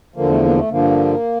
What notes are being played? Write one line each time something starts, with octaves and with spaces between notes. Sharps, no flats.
E2 D3 F3 A#3
A3
A#3
A3
G2 D3 F3 A#3